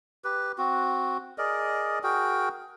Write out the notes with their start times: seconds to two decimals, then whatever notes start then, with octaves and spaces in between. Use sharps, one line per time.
0.24 G4 B4
0.58 C4 F#4
1.38 G#4 A#4 D5 D#5
2.04 F#4 G#4 A#4 G5